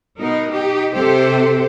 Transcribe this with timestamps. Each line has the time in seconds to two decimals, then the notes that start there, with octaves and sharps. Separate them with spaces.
0.18 B2 D#4 A#4
0.51 D#4 G4
0.93 C3 G4 A4 C5